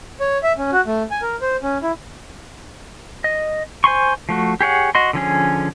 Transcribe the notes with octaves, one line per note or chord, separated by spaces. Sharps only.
C#5
E5
C#4
F#4
A3
G#5
A#4
C5
C#4
E4
D#5
C5 G#5 C6 C#6
F3 A3 F#4
G4 G#4 C#5 F#5
F#4 D#5 C6
D3 F3 C#4 G#4